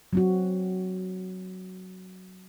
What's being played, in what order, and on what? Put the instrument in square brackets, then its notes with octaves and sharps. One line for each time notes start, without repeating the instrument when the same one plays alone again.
[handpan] F#3 C4 F#4